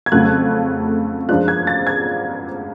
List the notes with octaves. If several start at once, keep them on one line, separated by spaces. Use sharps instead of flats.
G#6
F2 C#3 F#3 A3 F4 F#6
F#2 F3 G#3 D4 F4 F#6
G#6
A6
G#6